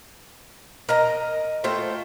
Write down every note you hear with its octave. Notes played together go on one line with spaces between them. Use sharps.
A#4 D#5 A#5
A3 F4 C5 G5